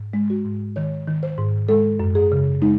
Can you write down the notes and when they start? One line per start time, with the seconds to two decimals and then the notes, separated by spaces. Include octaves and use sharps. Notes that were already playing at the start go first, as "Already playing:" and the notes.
Already playing: G#2
0.14 G#3
0.30 F#4
0.45 G#2
0.76 D#3 C#5
1.08 D#3
1.23 C5
1.38 G#2
1.69 G#3 A4
2.00 F#2
2.15 G#4
2.32 C#3
2.62 G#3 D#4